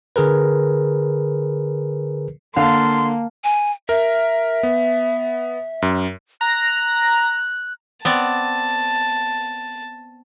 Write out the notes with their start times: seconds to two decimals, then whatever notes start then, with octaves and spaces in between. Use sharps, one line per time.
0.16 D3 G#4 A#4 B4
2.56 D3 A#3 F5 A5 C6
3.44 G#5
3.89 A#4 E5
4.63 B3
5.82 F#2
6.41 A#5 F#6
8.05 B3 C4 D5 A5